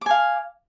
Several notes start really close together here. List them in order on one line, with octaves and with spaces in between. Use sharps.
D6 G#5 F5